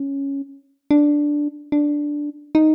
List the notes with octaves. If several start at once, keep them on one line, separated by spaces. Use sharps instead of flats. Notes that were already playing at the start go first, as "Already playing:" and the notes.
Already playing: C#4
D4
D4
D#4